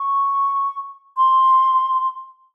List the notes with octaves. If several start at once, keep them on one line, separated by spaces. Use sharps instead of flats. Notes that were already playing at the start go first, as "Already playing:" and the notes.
Already playing: C#6
C6